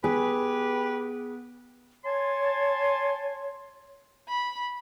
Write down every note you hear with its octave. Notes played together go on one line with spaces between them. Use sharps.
B3 G4 G#4 B4
C#5 G#5 A5 C6
B5